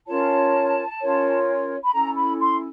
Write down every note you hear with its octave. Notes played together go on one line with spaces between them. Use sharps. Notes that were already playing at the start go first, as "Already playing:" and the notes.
C#4 F4 A#4 C#5 A5
C#4 F4 A#4 C#5
B5
C#4 E4 A4 A#5
B5
C6